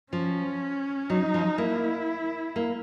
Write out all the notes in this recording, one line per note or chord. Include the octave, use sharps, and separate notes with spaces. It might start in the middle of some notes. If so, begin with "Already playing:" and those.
F3 C#4
F#3 D#4
F3
A#3 E4
A#3